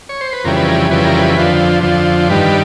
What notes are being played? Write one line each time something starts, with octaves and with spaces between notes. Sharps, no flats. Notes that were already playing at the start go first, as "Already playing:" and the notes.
C#5
C5
B4
F2 C#3 E3 G3 A#4
B4
A#4
F2 C#3 E3 G3 B4
A#4
B4
F2 D3 F3
F2 D3 F3
G2 D#3 G3 B4